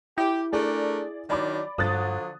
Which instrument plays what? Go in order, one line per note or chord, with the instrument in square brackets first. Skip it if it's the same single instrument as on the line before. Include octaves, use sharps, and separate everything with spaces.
[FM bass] E4 [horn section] G4
[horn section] A3 D4 A#4 [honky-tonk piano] G#4 D5
[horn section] D#3 F#3 D4 [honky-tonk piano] D5 B5 D6
[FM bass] G2 [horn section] D3 F3 F#3 [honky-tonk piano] D#6 F#6 A6